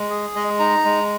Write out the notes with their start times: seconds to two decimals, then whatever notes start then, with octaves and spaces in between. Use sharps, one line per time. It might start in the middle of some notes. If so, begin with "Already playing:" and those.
Already playing: G#3
0.10 G#4
0.35 G#3 D#5
0.59 D#4 A#5
0.85 G#3